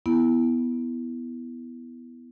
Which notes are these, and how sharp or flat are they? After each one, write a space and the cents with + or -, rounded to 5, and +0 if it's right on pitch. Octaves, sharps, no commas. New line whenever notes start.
B3 +0 E4 +0